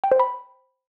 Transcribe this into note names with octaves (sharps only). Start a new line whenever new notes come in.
G5
C5
B5